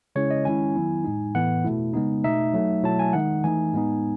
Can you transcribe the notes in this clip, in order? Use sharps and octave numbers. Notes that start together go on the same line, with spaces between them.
C#3 G#3 C#4 E4 C#5
D#5
D#3 G#3 C#4 E4 G#5
D#3 F#3 B3 E4
A2 G#3 D#4
A2 E3 B3 F#5
B2 A3 E4
C#3 G#3 B3 D#4
B2 A3 D#4 E5
F#3 A3 D#4
B2 F#3 A3 E4 A5
G#5
D#3 G#3 D#4 F#5
E3 A3 D#4 G#5
A2 G#3 B3 D#4